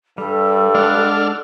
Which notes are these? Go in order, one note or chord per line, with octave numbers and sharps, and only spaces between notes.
G2 G3 A4
G#3 D4 F#5 F6